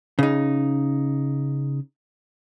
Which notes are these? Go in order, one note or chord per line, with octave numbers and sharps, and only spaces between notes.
C#3 D#4